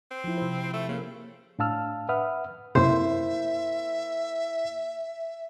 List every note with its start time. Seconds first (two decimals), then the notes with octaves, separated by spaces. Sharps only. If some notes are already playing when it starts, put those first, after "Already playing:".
0.11 C4
0.24 F3 E4
0.38 C3 C5
0.73 A3
0.89 C#3 A#3
1.59 A2 D4 F5 A5 E6 F6
2.09 B4 E5 F#5 B5 D#6 F6
2.75 F#2 C3 A#3 E4 C5 E5